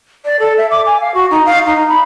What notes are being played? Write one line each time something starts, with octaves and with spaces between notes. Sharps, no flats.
D5
A4
E5
D6
G#5
F5
F#4
D#4
F5
D#4
B5